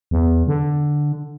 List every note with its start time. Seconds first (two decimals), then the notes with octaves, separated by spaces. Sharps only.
0.11 E2
0.47 D3